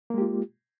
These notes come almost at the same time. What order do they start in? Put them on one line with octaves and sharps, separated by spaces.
A#3 G#3 G4 F4